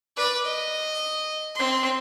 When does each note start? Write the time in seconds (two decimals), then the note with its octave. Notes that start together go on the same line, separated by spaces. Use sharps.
0.17 B4 D5
0.45 D#5
1.55 C4 C6